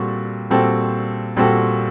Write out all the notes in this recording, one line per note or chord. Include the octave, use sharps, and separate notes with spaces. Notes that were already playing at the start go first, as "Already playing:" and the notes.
Already playing: A#2 G3 C4 F#4 A4
A#2 G3 C4 F#4 A4
A#2 G3 C4 F#4 A4